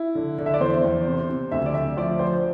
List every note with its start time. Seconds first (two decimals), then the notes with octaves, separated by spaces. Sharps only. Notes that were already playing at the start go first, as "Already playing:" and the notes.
Already playing: E4
0.15 D3
0.38 D3
0.46 E5
0.54 D5
0.60 E2 C5
0.84 E2
1.07 C3
1.30 C3
1.52 D2 E5
1.66 D5
1.74 D2 E5
1.97 F3 D5
2.19 F3 C5